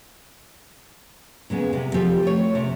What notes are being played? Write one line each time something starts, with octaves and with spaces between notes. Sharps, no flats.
A#2 C#3 G#3 B3
C3
F3 C4 G4 A4
A3 C#5
C3